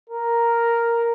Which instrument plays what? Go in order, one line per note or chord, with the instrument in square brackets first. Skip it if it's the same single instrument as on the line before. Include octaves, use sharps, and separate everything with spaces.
[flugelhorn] A#4